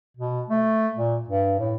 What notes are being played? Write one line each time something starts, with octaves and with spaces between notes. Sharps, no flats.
B2
A3
A#2
G2
A2